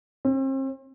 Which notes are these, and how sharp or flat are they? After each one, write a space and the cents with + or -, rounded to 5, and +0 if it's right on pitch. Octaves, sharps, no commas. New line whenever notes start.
C4 +40